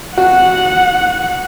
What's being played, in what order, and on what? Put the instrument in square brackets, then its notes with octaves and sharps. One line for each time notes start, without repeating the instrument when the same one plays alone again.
[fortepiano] F#4 [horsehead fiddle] F#5